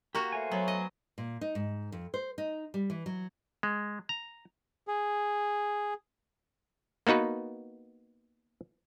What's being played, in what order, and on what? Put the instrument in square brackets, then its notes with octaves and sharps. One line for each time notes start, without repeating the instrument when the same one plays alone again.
[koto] A#3 F#4 [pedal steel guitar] G4
[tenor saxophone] A3 [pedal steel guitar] C5 C#5 G#5
[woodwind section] F#3 [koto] B3
[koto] D#5
[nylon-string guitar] A#2
D#4
G#2
F2
C5
D#4
G3
E3
F#3
[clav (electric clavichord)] G#3
A#5
[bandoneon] G#4
[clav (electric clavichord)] A#3 B3 D#4 F#4 B4